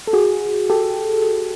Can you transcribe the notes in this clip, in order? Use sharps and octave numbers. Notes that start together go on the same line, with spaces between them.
A4
F#4 G#4
G4 A4